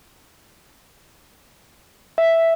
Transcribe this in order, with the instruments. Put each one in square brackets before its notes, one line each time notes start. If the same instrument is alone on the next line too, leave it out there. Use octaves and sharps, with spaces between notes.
[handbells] E5